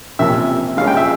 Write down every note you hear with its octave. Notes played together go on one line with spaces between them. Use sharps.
F2 C3 F3 A#3 C#4 E5
A#1 A#2 G#3 C#4 F5
G5
E5